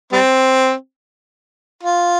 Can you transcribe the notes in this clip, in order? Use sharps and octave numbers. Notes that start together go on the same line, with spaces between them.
G3 C4
F4